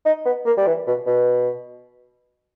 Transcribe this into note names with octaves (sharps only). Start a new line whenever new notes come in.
D#4
B3
A#3
G3
E3
B2
B2